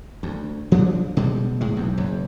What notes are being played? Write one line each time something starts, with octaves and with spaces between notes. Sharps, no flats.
D2
F3 G3 G#3 D4
B2 G3 G#3
A2 G#3
B1 E2
F#1 E2